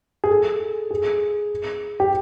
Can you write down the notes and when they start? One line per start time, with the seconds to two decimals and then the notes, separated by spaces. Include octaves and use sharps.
0.24 G#4
0.31 A4
0.91 G#4
2.00 G4